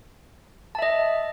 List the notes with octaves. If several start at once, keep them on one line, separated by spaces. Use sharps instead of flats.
D#5 E5 A5